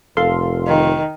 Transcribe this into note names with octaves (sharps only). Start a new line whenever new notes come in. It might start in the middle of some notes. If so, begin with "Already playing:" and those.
F1 A4 F5 C6
D#3